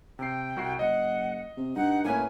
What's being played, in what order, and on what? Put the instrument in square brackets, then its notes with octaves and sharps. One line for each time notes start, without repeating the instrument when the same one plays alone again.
[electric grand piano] C3 C7 [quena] G5
[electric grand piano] C2 F#4 C7
[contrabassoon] F#1 [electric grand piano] D#5 [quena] F#5
[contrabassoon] C3
[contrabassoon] G2 [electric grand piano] D#4 [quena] F#5
[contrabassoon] A2 [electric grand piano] A#3 C#4 B4 [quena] G#5